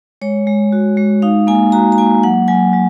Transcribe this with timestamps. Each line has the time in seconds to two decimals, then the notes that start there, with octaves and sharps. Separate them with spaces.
0.21 G#3 C#5
0.47 G#3
0.72 F#4
0.97 G#3
1.22 D#4 F5
1.47 A#3 G#5
1.72 F#4 A#5
1.92 A#5
1.98 A#3 G#5
2.23 F#3 F#5
2.48 F#3 G#5
2.73 F#3